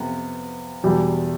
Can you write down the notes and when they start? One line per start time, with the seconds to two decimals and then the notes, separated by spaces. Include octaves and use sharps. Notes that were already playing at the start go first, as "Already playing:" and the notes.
Already playing: F2 C3 B3
0.83 E2 B2 G3